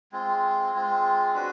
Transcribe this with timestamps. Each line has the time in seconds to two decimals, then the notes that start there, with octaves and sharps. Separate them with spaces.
0.12 G#3 C4 F4
0.74 G#3 C4 F4
1.34 D4 F#4 B4